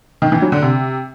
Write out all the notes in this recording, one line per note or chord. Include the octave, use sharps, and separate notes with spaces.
D#3
E3
F#3
D3
C3